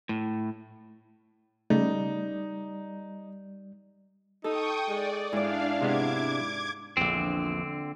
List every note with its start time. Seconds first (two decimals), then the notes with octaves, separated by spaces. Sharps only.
0.09 A2
1.70 C#3 G3 A3 D#4 D5
4.44 D#4 A4 G5 C#6 D#6
4.89 G#3 D5
5.33 G#2 D4 E4 D5 F5
5.81 C3 G#3 B3 D6 G#6
6.97 A#1 E2 D3 C4